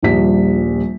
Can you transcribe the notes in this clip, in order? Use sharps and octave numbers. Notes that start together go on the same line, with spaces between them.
D#1 A#1 G3 B6